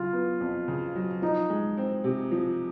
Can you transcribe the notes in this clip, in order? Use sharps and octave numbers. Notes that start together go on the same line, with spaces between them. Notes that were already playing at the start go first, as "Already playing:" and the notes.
Already playing: C#3 F#3 F4
B3
F2
C#3
F#3
F3 D#4
G#3
C4
C3
F3